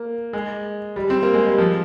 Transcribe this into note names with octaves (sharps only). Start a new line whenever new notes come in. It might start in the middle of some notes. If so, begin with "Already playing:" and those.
Already playing: A#3
G#3
G3
C4
A#3
G#3
G3
F3